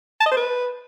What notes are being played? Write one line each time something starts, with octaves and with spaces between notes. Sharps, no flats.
A5
D#5
C5
B4